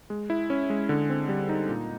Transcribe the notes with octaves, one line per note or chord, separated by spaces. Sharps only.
G#3
E4
C#4
G#3
D3
C4
G3
D#4
A#2